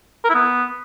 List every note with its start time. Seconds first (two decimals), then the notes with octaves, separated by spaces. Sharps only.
0.24 A#4
0.29 E4
0.35 B3